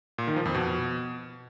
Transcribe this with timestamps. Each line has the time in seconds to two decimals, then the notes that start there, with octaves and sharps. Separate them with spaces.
0.18 A#2
0.27 D#3
0.36 F3
0.45 F2
0.55 B2